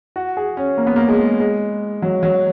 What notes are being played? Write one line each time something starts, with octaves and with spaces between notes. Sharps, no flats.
F#4
G#4
C#4
A#3
B3
A#3
G#3
G#3
F#3
F#3